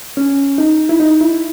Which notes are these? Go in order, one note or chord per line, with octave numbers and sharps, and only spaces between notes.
C#4
D#4
E4
D#4
E4